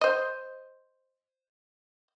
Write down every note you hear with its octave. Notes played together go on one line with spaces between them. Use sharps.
C5 D#5